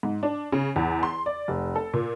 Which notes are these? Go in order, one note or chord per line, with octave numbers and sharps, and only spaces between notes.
G#2
D4
C#3
E2
C6
D5
F1
A4
A#2